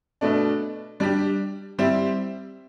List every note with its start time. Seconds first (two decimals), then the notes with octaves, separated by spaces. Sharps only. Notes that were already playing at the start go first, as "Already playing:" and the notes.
0.21 B2 A3 D4
1.00 G3 D4 G4
1.78 G3 C4 E4 G4